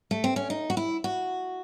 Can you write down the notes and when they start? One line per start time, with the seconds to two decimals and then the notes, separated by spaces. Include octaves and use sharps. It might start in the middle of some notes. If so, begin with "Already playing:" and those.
0.11 A3
0.24 C4
0.36 C#4
0.50 D#4
0.70 F#4
0.77 E4
1.04 F#4